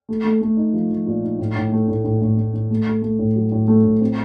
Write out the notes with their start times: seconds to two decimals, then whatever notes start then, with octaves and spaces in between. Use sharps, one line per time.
0.09 A3
0.25 A3
0.41 A3
0.57 D#4
0.73 F3
0.91 F3
1.07 A#2
1.22 D#4
1.39 A2
1.56 A2
1.72 A3
1.88 A2
2.04 A2
2.22 A2
2.37 A2
2.54 A2
2.71 A3
2.87 A3
3.02 A3
3.19 A2
3.36 F#3
3.52 A2
3.68 A3
3.84 A2
4.01 C4